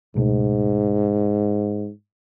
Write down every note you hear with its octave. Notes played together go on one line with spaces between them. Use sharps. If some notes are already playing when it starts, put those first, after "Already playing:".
C#2 G#2 B2 A3